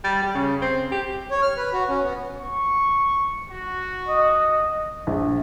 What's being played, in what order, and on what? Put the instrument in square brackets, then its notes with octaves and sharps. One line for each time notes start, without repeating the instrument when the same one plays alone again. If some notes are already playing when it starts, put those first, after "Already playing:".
[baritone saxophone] G3
G3
C#3
C4
G4
[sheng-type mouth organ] C#5
F6
B4
F#4
C#4
B3
[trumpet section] C#6
F#4
[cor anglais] D#5
[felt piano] A#1